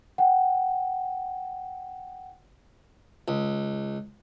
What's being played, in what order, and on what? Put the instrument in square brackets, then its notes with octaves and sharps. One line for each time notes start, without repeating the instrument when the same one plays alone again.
[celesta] F#5 G5
[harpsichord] C#2